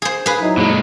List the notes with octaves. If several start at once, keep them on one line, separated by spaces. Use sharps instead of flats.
G#4 C5
G#4 B4
F#3 D#4 E4
A#2 G#3